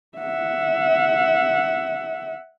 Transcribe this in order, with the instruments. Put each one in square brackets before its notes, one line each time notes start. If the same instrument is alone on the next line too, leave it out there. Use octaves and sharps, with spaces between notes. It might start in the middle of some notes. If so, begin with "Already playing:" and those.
[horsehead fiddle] E5 F#5